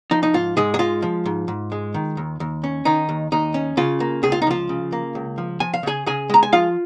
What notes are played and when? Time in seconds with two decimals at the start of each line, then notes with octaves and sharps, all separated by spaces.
0.11 F3 D#4
0.23 D#4
0.34 G#2 F4
0.57 G#2 G#3 G#4
0.74 G#4
0.79 G#3 F4
1.02 F3
1.26 G#2
1.48 G#2
1.72 G#3
1.94 D#3
2.17 D#2
2.40 D#2
2.64 C#4
2.85 D#3 D#4
3.09 D#2
3.32 D#2 D#4
3.54 C#4
3.77 C#3 F4
4.00 A#3
4.23 C#2 G#4
4.32 F4
4.42 D#4
4.47 F3 F4
4.69 C#3
4.92 A#3
5.15 C#2
5.38 F3
5.60 F3 G#5
5.74 F5
5.83 C#3 G#4 G#5
6.06 C#3 G#4 G#5
6.29 G#3 A#5
6.43 G#5
6.53 F3 F4 F5